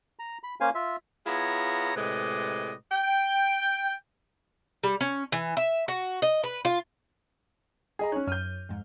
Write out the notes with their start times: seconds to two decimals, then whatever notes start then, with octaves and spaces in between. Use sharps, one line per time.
0.19 A#5
0.43 B5
0.61 A#3 C#4 C5 F5 G#5
0.75 F4 E5
1.26 B3 E4 F4 G#4 C#5 A#5
1.96 A2 C3 G#3 B4 D5 D#5
2.92 G5
4.84 G3
5.01 C#4
5.32 E3
5.57 E5
5.88 F#4
6.22 D#5
6.44 B4
6.65 F4
7.99 G#4 D#5 A#5
8.12 C#4 D#4 C#5 F#6
8.27 F#2 C#5 F6 G6 D#7
8.69 F2 G#2